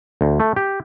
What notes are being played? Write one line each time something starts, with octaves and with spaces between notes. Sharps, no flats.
D2
A3
G4